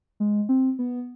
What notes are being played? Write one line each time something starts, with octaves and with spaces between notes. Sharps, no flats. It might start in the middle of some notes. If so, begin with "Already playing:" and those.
G#3
C4
B3